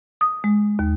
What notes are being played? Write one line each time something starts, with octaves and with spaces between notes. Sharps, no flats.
D#6
G#3
D#2